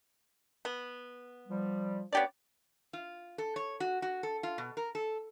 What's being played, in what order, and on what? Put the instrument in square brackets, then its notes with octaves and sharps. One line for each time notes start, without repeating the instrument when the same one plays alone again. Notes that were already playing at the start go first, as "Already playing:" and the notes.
[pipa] B3
[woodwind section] F3 G3
[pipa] B3 G4 D5 [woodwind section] C#4 D4 C#5
[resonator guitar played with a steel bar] F4
A4
C#5
F#4
F#4
A4
F4
B2
A#4
A4